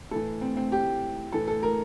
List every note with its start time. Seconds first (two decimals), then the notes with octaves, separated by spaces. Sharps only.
0.11 A2 E3 A4
0.41 C4
0.57 C4
0.72 G4
1.32 A2 E3 A4
1.48 A4
1.63 A#4